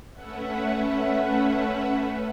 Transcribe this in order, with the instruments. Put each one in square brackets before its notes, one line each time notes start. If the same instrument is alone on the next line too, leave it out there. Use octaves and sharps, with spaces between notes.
[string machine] A3 C#4 B4 E5 F#5